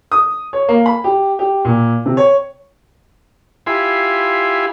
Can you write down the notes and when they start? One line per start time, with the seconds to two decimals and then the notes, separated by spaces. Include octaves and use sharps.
0.12 D#6
0.53 C#5
0.69 A#3
0.86 B5
1.04 G4
1.39 G4
1.65 A#2
2.06 C3
2.17 C#5
3.66 E4 F4 G4 G#5 B5 C6